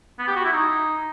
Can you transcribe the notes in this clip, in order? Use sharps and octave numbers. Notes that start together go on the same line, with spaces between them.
B3
G4
F#4
E4
D#4